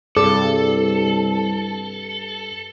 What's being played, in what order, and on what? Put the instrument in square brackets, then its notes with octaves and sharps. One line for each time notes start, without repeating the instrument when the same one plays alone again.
[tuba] C2 [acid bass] G2 [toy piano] G#4 [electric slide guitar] A4